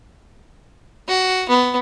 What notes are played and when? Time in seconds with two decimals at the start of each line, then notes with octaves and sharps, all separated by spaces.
1.08 F#4
1.49 B3